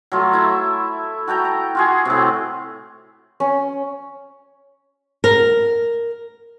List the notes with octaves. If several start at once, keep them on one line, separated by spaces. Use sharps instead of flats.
F#3 A3 F4
E4 E5
F#4 A4 G5 A#5
A#5
F4 F#4 G#4
A2 C3
C#4
A#4